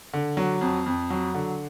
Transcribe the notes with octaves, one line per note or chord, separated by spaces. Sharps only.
D3
F#3
F2
F2
F#3
D3